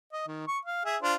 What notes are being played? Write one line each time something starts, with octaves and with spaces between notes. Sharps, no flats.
D#5
D#3
C#6
F5
G#4 E5
D4 F4 C5